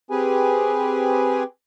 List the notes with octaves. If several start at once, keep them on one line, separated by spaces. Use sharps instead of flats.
C4 G4 G#4 B4 G#5